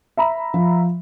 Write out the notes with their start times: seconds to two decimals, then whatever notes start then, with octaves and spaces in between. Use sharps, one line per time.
0.17 E5 A#5 B5
0.54 F3